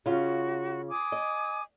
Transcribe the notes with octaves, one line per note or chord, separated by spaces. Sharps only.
C#3 F4 F#4
G#5 D6 D#6
D#5